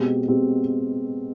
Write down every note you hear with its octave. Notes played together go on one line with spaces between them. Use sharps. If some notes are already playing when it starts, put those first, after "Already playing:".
Already playing: B2 G#3 C4 G4
B2 G#3 C4 G4